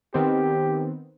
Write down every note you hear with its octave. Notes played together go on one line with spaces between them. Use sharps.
D#3 B3 C4 G4